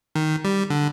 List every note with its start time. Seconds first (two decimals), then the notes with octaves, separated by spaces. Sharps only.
0.15 D#3
0.45 G3
0.70 D3